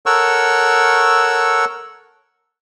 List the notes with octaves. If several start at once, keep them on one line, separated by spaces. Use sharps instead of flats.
A4 A#4 C#5 F#5 C#6 E6